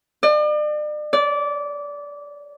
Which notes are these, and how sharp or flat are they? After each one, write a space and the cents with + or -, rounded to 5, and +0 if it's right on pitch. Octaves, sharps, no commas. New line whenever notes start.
D5 +40
D5 -20